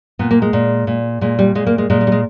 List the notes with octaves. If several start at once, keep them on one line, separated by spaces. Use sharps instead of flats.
A#2 B3
A#3
G#3
A#2
A#2
A#2 G#3
G3
A#2 G#3
A#3
G#3
A#2 G#3
G#3
G3
G#3